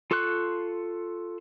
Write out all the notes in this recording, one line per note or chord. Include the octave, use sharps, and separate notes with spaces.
F4 A4 C6 C#6 F#6